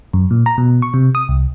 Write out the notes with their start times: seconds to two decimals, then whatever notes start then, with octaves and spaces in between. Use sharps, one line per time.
0.13 F#2
0.31 A#2
0.46 A#5
0.58 B2
0.82 C#6
0.94 C3
1.15 D#6
1.29 C2